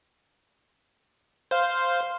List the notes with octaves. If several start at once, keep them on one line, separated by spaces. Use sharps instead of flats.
C5 F5